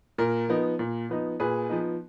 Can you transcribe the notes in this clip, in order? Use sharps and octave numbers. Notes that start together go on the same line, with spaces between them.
A#2 A#4
F3 B3 D#4
A#2
F3 B3 D#4
A#2 G#4 B4
F3 B3 D#4